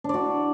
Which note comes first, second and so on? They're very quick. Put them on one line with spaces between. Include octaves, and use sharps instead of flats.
D4 D5 F#4